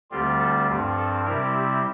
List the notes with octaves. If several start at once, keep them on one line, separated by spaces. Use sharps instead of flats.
D2 D3 G3 C4 F4 G4
A4
G2 F3 C4 G4
A4
C3 G3 C4 E4 A#4
G4